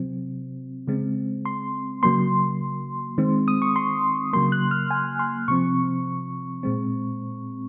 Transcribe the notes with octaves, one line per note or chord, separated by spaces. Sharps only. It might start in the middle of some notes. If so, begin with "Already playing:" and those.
Already playing: C3 F#3 C4
C#3 G#3 C4
C6
C#3 F#3 A#3 C6
D#3 G#3 C4
D#6
C#6
C6
C#3 F#3 A#3 C6
F#6
F6
G#5
C6
C3 F3 C4 C#6
A#2 G#3 C4